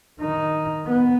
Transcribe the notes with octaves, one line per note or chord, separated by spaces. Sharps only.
D#3 D#4
B3